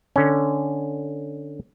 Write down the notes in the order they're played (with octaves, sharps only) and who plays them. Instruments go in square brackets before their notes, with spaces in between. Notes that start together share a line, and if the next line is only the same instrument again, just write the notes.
[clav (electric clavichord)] D3 C#4